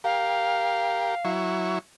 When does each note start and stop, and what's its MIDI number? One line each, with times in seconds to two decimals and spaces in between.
0.04 1.15 67
0.04 1.15 70
0.04 1.30 77
1.25 1.79 54
1.25 1.79 64
1.25 1.79 85